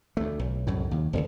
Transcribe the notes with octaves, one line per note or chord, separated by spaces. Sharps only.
D2 A3
B1
C2 F#2 A2
D#2
D#1 C#2